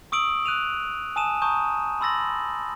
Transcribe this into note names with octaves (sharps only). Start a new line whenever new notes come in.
C#6 D#6 E6 D7 F#7
D#6 F#6 D#7 F7
G#5 A5 D#6 D#7 E7
A5 A#5 C#6 D#6 G6
B5 C6 E6 A6 A#6 F#7